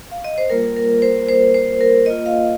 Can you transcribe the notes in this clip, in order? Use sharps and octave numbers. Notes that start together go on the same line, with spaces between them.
F5
D#5
C5
G3 A#3 F4 A#4
A#4
C5
C5
C5
A#4
A#3 F4 D#5
F5